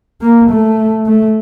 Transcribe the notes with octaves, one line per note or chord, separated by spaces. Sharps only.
A#3
A3
A3